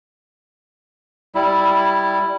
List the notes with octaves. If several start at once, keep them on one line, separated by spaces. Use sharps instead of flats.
G3 E4